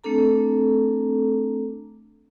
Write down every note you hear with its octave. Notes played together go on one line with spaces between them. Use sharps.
A3 C4 D4 A4 A#5